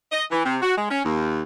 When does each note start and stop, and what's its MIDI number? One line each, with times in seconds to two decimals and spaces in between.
0.12 0.24 75
0.31 0.40 52
0.45 0.56 48
0.62 0.76 66
0.77 0.88 56
0.90 0.99 61
1.05 1.41 39